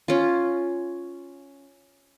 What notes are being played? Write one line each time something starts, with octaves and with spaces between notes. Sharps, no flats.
C#4 F4